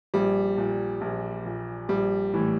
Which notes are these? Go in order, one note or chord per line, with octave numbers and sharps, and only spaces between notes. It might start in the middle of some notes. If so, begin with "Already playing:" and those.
A#1 G3
A#2
A#1
A#2
A#1 G3
A2 E3